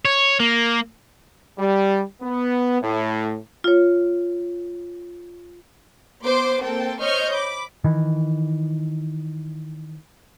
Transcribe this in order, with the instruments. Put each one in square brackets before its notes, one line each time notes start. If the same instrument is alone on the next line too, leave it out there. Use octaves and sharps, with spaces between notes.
[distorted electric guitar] C#5
A#3
[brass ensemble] G3
B3
A2
[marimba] F4 C#5
[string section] B3 C5 C6 D6
A#3 C4 A4 G5
C5 C#5 D#5 C#6 F6 G6
B5 D6
[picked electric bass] D#3 E3